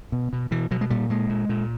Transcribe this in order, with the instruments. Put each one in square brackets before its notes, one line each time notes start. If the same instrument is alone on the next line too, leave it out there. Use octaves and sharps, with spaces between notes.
[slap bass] B2
B2
B2 E3
B2 F#3
G#3
A#2 G3
A#2 G#3
A#2
A#2